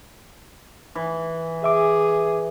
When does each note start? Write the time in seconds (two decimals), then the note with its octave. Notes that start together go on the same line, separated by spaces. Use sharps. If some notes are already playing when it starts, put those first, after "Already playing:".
0.95 E3
1.64 G#4 E5 D6